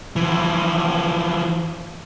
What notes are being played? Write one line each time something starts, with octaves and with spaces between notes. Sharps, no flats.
E3 F3